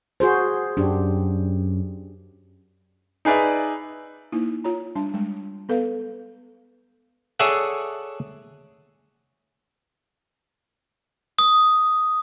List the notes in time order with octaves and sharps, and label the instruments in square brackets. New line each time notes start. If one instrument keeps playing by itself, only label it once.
[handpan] F#4 G#4 C5
[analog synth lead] F#2 [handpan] D4 G4
[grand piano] D#4 G#4 B4 D5 E5
[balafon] A#3 D#4 E4
F4 C#5 A#5
G3 D4 A5
G3 G#3
B3 A4 B4 F5
[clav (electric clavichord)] G#4 A4 C#5 D5 E5 F#5
[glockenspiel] D#6